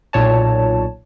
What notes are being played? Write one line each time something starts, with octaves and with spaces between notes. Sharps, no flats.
B1 A#2 C#5 A5